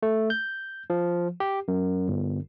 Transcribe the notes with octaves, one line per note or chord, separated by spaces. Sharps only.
A3
G6
F3
G4
F#2
G1